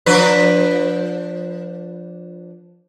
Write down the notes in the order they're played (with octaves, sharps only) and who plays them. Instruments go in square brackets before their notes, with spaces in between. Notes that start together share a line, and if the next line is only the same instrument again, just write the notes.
[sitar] F3 D4 B4